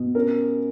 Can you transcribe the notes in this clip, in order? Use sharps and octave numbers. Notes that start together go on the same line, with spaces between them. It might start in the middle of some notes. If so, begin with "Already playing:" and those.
Already playing: B2
C#4 A#4